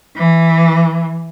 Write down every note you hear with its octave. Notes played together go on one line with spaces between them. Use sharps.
E3